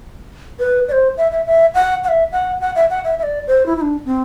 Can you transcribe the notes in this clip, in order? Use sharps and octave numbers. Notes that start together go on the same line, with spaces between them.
B4
D5
C5
E5
E5
E5
F#5
F#5
E5
F#5
F#5
E5
F#5
E5
E5
D5
C5
E4
E4
D4
C4